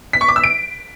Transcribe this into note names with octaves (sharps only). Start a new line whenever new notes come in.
B6
C#6
D6
E6
D7